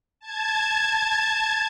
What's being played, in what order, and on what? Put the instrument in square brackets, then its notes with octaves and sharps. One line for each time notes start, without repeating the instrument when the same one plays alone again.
[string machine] A5 G#6